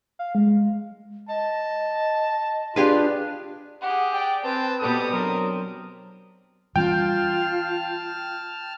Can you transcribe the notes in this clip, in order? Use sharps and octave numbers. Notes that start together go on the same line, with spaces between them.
F5
G#3
D#5 A5
D4 F4 G4 G#4 B4 C6
G4 G#4 F#5
D5 G5
C4 B4 G5 A5
B2 G3 G4 A4 D#6
F#3 C4 D4 A#4
E3 G3 C#4 F4 G5 A5 F6